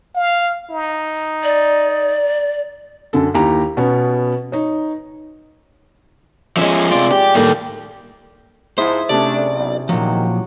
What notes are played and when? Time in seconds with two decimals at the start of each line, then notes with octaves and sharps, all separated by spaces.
0.15 F5
0.71 D#4
1.44 D5
3.13 F#2 D3 A4
3.34 D#2 E4 G4 A#5
3.77 B2 B3 C#4
4.52 D#4 C#5
6.57 F3 G#3 C#4 E5
6.91 C3 F4 D5
7.12 G4
7.35 A2 D#3 G3 A#3
8.78 G#2 F3 E4 G#4 C5 E5
9.09 C3 A3 C#4 D4 D5
9.53 B1
9.89 A#2 D#3 F3 F#3